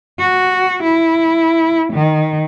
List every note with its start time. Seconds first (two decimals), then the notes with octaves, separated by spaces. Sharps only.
0.19 F#4
0.83 E4
1.93 D#3